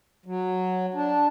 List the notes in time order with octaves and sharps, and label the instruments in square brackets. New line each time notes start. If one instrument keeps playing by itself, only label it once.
[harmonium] F#3
D4